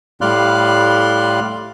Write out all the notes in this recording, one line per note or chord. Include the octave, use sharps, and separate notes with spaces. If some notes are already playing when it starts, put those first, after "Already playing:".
A2 G3 D5 F5 C6 F#6